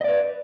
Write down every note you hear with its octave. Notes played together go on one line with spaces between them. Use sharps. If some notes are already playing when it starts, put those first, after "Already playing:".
B4 D5 D#5